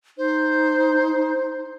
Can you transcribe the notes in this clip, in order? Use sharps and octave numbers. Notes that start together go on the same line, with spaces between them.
D#4 C5